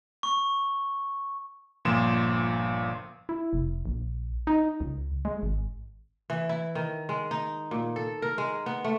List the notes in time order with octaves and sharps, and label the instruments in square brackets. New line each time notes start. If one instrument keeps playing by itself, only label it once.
[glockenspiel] C#6
[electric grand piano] G1 A#2 F3 C6 E7
[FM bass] E4
F1
A#1
D#4
C#2
G#3
G#1
[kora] E3
E4
D#3
G#3
D#4
A#2
A4
A#4
G#3
B3
A3